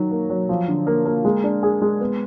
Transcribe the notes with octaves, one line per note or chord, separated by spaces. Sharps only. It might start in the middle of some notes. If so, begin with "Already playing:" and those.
Already playing: D#3 F#3
A#3
F#3
F3
D3
A#3
A#3
G#3
D4
G#4
G#3
B3